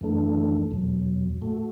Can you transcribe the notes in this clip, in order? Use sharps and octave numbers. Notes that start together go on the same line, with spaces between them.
F#2 E3 A3 D4 A4
E2 B2 F#3
A2 A3 F#4 A4